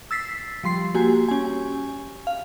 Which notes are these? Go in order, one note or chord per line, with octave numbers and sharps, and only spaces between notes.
E6 A6 B6 C7
F3 G3 C6 C7
A#3 F#4 G4 G#5
C#4 G#5
F5